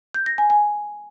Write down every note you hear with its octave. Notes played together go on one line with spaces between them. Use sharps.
G6
A#6
G#5
G#5